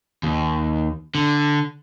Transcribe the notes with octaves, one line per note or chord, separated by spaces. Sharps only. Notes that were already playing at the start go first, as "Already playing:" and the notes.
D#2
D3